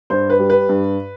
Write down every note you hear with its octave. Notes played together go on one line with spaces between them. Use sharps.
G2 C5
B4
G3
B4
G2